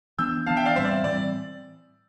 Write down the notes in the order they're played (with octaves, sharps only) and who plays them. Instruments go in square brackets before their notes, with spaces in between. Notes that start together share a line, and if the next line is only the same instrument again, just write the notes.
[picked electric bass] E3 B3 D4 [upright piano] E6 G6
[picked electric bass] E3 B3 D4 [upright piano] F5 A5
[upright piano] E5 G5
D5 F5
[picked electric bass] A2 E3 G3 C4 [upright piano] C5 E5
[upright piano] D5
[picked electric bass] A2 E3 G3 C4 [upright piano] D5